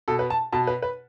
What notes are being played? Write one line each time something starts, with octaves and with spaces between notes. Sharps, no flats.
B2 A4
B4
A5
B2 A5
B4
B4